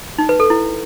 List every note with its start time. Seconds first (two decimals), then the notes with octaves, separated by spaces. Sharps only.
0.18 D#4
0.29 B4
0.40 A4
0.50 E4